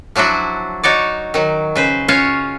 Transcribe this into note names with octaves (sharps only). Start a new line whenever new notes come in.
F3 F#3 D4 E4 F#4
D#4 F#4 C#5 D5
D#3 F#3
C#3 B4 C5
C#4 F4 F#4 C#5 F5